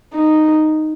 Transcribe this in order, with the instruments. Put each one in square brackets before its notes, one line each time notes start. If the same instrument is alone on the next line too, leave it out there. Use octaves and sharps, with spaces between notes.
[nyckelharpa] D#4